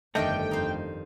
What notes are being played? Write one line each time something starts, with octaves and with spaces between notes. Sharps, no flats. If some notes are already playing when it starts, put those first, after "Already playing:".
G1 F2 D3 D#3 G3 A3 D#5 G5
F2 D#4 C5